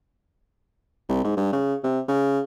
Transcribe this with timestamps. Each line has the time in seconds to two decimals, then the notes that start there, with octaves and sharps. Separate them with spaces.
1.09 C2
1.24 G#2
1.37 G2
1.52 C#3
1.84 C3
2.08 C#3